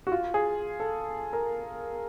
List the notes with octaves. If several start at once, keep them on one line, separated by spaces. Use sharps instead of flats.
F#4
F4
G#4
A4
A#4